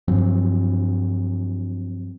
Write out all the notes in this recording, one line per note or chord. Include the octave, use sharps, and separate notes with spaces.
G2 F3 F#3 C4